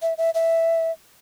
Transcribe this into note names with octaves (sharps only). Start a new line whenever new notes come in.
E5
E5
E5